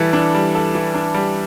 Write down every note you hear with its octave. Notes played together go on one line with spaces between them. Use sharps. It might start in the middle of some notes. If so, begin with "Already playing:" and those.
Already playing: E3 G3 A4
D4
G3
A4
E3
D4
G3